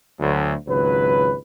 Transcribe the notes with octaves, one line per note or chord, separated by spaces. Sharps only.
D2 F#3
G#1 C#2 F#3 B4